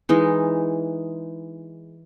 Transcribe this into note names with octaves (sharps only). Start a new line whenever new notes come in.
E3 G#3 D#4